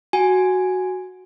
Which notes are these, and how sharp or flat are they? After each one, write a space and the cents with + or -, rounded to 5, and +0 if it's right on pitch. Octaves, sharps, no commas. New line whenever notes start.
F#4 +0 G#5 +0